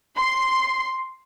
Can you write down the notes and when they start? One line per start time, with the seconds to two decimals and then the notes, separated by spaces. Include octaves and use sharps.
0.17 C6